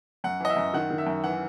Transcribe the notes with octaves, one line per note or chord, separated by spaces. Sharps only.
F#2 F#5
E3 D#5
E5
F#2
D#3 F#5
D#3
E5
F#2
E3 F#5